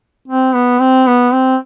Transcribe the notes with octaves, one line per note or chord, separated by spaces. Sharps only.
C4
B3
C4
B3
C4